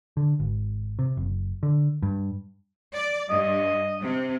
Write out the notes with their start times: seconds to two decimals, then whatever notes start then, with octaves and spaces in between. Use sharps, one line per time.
0.17 D3
0.40 G#1
0.99 C3
1.17 F#1
1.63 D3
2.02 G2
2.94 D5
3.30 G2 D#5
4.01 C3